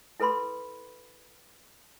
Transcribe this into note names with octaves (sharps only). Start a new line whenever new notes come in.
E4 A4 B4 B5 C6